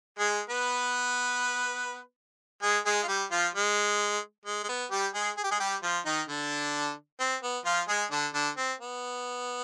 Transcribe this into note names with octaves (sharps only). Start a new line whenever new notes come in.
G#3 G#4
B3 B4
G#3 G#4
G#3 G#4
F4
G3 G4
F3 F4
G#3
G#3
G#3
B3
G3 G4
G#3 G#4
G#4
G4
G#3 G#4
G3 G4
F3 F4
D#3 D#4
D3 D4
C4
B3
F3 F4
G#3 G#4
D3 D4
D3 D4
C4
B3